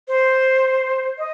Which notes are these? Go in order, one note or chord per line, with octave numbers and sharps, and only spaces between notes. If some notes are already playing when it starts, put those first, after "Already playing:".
C5
D#5